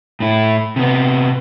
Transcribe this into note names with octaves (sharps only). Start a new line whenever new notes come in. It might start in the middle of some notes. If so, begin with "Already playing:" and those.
A2 E4
C3 B3